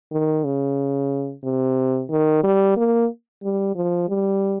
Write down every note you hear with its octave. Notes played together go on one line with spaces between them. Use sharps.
D#3
C#3
C3
D#3
G3
A#3
G3
F3
G3